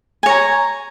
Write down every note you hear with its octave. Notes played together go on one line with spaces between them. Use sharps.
C#5 G#5 A#5